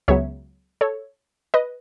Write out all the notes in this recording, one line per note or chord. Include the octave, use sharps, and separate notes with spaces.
C#2 C#3 F#3 B3 C#5 E5
A4 C#5
B4 D#5